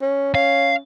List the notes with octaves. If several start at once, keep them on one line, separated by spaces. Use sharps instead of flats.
C#4
C#4 F5